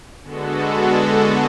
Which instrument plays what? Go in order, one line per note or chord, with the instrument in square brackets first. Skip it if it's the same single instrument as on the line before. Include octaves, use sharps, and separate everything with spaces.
[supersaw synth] D3 G#3 B3 F#4 A4